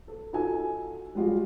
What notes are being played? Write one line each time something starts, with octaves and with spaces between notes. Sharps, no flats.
A4
D#4 F4 F#4 A4 G#5
G3 G#3 F4 F#4